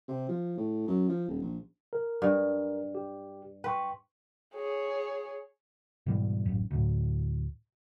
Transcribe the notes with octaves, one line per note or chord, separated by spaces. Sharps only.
C3
F3
A2
F#2
F3
D#1
A#1
A#4
G2
G4
B4 G5 C6 C#6
G#4 C#5
G#2 B2 E3 G3
A1 F#2
D2 A2